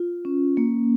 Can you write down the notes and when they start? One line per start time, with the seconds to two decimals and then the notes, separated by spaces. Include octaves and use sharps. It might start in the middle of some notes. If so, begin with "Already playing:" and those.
Already playing: F4
0.25 C#4
0.57 A#3